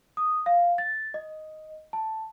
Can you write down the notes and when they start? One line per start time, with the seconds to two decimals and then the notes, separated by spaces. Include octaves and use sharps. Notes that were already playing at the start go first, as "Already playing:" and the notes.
0.17 D#6
0.46 F5
0.78 A6
1.14 D#5
1.93 A5